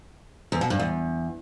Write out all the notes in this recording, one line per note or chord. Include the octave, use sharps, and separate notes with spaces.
E2
B2
G2
E2